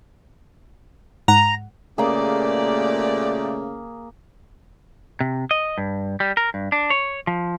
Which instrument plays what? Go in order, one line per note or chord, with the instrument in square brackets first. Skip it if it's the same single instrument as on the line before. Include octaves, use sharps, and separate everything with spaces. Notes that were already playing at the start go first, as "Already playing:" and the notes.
[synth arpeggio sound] G#2 F#5 [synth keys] A#5
[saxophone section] A#2 G4 D5 [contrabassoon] C#3 [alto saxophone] A3 [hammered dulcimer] A#3 G#4
[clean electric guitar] C3
D#5
G2
G3
A#4
G2
D4
C#5
F3